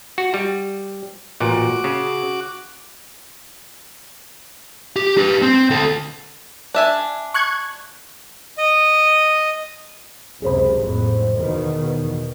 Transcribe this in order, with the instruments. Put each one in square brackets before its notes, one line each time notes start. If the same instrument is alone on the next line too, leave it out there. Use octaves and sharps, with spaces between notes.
[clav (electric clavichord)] F#4
G3
[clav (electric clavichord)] A1 A#2 [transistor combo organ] F#4 D6
[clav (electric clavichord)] C#3
[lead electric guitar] G4
G4 B4
C4
D2 A4
[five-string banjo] D4 E5 G#5
[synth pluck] C#6 F#6 G#6
[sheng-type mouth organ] D#5
[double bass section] C#2 F#2 C3 [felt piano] G#4 C5 B5
[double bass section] F#1 F2 A2
E2 B2 D#3